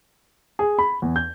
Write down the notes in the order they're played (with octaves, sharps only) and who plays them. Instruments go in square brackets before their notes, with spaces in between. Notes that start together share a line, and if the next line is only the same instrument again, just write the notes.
[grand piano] G#4
B5
E2
G6